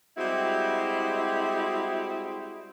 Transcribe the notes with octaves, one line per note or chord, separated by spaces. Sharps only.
G3 G#3 C4 E4 F#4